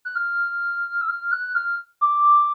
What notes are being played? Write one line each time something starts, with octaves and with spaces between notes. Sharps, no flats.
F#6
F6
E6
F6
F#6
F6
D6